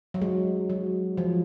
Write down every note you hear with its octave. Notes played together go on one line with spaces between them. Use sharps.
F#3
G#3
F#3
F3